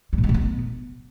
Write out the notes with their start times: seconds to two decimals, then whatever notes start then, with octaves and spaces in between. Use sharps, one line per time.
0.13 G3
0.18 A#2
0.24 G#3
0.29 A#2
0.34 B3